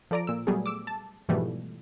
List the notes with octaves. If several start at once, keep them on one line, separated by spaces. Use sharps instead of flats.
F3 A4 D5 A#5 D7
A#2 E6
F#3 G3 A3 B3 G#4
D6 E6
A5
G#2 B2 E3 F3 G3 A3